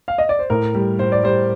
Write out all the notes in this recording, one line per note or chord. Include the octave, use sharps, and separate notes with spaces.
F5
D#5
D5
C5
A2 A#4
G3
A2 C5
D5
G3 C5